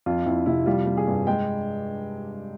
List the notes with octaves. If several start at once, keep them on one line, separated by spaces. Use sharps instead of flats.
F2 F4
F2 E4
C3 E4
G3 F4
G3
G#4
G2
G#3 G5